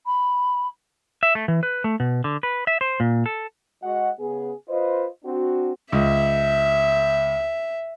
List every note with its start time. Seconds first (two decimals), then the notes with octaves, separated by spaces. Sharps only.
0.06 B5
1.23 E5
1.35 A3
1.48 E3
1.63 B4
1.84 A3
2.00 B2
2.24 D3
2.43 B4
2.67 E5
2.81 C5
3.00 A#2
3.26 A4
3.83 G#3 F#4 D#5 F#5
4.19 C#3 B3 G#4
4.69 F4 B4 C5 D#5
5.24 C4 D4 F#4
5.92 C#2 E5